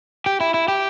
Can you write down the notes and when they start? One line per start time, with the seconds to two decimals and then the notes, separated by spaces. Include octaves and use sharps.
0.26 G4
0.40 E4
0.54 E4
0.68 G4